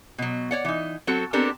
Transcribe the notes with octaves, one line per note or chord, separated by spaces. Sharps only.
B2 F#3
C#5 D5 F#5
E3 D#4
F#3 C4 F#4 A4
B3 C4 D4 G4 A4 A#4